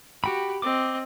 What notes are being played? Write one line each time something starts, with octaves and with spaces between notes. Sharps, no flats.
F#4 G4 G5 B5
C4 D#5 D6